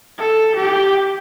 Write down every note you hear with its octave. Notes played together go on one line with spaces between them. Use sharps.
A4
G4